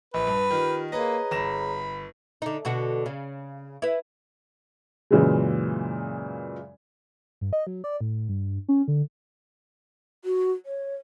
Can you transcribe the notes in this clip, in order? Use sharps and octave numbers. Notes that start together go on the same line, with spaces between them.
A#1 B4
G2
D#3 F4 G4
A#3 G#4 B4 C#5 D#5 A#5
G1 B5 A#6 E7
D3 D#4
B2 D3 F#4
C#3
E4 B4
F#2 A#2 C#3 E3 F#3 G#3
G2
D#5
F#3
D5
A2
G2
C#4
D3
F#4
C#5